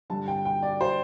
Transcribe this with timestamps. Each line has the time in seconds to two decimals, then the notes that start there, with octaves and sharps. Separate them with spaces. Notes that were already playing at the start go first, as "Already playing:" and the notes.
0.10 G2 D3 G3 A5
0.28 G5
0.45 G5
0.63 D5
0.81 C5